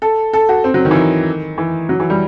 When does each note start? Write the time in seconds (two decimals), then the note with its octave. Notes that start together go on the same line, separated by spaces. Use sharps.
0.02 A4
0.33 A4
0.49 F#4
0.64 C4
0.74 F#3
0.85 D#3
0.91 E3
0.95 D#3
1.58 E3
1.89 F#3
2.00 E3
2.10 G3